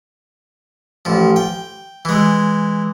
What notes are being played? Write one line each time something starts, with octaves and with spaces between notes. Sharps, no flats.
A1 F3
G5
E3 G#3